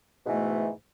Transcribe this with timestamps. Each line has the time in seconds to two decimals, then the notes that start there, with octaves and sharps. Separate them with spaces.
0.23 G#2
0.26 B2
0.29 E3
0.31 A3